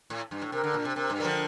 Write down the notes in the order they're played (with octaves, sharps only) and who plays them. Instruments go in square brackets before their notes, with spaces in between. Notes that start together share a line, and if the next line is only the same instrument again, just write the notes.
[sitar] A2
G2
A2
[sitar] C3 [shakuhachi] A#4
[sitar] D3
A#2
C3
[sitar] C3 [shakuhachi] A#4
[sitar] G2
[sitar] G3 [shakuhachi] A#4
[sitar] D3 F3